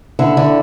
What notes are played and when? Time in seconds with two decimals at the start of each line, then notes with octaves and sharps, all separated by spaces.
0.19 D3 E4
0.37 D3